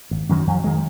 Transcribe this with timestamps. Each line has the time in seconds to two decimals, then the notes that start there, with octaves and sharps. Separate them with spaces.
0.11 G#1
0.29 F#2 D#3 F#3
0.47 F2
0.64 D#3 G#3